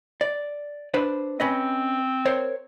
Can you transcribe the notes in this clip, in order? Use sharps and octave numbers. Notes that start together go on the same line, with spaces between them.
D5
D4 B4 C5
C4 C#4 B4 D#5
A#4 C5 C#5